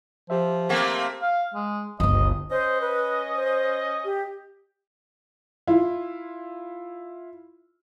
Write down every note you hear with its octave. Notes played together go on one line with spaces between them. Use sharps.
F3 G4 C5 E5
A3 A#3 C4
F5
G#3
G1 C#2 D#5
C#4 C5 D#5
B4
C5
G4
E4 F4